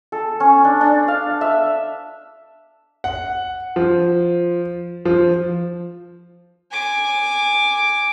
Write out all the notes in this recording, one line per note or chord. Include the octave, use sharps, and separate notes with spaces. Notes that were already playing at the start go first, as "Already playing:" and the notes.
A4
C#4
D4
D4
F5
E5
F#5
F3
F3
G#5 D6